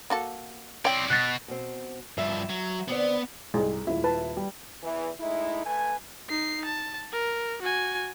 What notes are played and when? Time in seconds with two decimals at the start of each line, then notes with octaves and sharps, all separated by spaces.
0.10 A#3 F#4 A4
0.85 C4 C#5 D5 G5
1.10 B2 F#6 A6
1.48 B2 C4
2.18 G2 F3 E5
2.49 F#3
2.88 D3 B3 C4 D5
3.54 C2 G#2 G#3
3.87 D#1 E4
4.04 B4 A5
4.37 G3
4.83 E2 E3
5.20 G#3 A3 D#4 E4
5.64 A3 B4 G#5
6.29 D#4 C7
6.65 A5
7.12 A#4
7.62 F#4 G#5